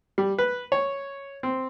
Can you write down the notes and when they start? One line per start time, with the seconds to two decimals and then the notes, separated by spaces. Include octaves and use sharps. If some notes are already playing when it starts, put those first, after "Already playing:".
0.18 G3
0.38 B4
0.72 C#5
1.43 C4